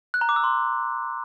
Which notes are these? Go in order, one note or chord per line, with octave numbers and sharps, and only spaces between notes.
F#6
A#5
D6
E6
C6